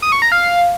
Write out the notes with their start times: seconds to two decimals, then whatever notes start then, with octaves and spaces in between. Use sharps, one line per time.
0.02 D#6
0.12 C#6
0.22 A#5
0.32 F5